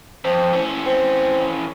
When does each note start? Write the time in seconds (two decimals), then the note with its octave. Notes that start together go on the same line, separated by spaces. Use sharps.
0.25 F2 C5
0.53 E3 C#4
0.86 C4